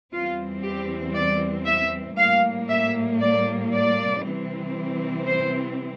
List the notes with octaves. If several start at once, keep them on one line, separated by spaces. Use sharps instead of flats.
E2 E3 G3 C4 F4
G4
D5
E5
A2 G3 A#3 F5
E5
D5
D5
C3 E3 G3 C4
C5